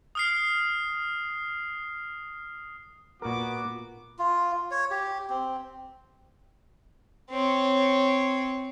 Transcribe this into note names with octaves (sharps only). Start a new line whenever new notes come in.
D#6 F6 C7
A#2 B3 F#4 A#4 D6
F4
C#5
G4
C4
C4 C#5